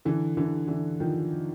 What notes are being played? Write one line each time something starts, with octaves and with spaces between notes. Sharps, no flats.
D3 E3
D3 E3
D3 E3
D#3 F3